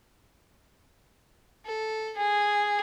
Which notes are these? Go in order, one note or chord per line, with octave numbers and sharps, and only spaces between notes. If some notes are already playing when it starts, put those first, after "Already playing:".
A4
G#4